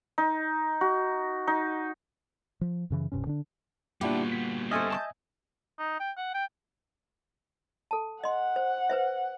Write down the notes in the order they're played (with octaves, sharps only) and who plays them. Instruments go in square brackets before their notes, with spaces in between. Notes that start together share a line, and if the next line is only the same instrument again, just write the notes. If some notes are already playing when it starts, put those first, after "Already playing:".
[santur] D#4
F#4
D#4
[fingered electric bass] F3
F#2 C#3 E3
D1 G2 C3 C#4
D3 D4
[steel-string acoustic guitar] A#2 F#4 [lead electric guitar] G3 B3 [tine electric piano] D4 E4 G4
[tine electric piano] B6
[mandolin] C#4 A4 C5 [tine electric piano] D#5 E5 G#5
[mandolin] A5 C#6 G6
[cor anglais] D#4
G5
F#5
G5
[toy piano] A4 A5
[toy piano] D#5 C6 [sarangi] F#5
[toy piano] C5
B4 C5 E5